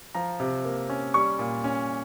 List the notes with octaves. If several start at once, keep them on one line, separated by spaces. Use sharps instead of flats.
F3 A#5
C3
A#3
C#4
G3 C#6
A#2
C#4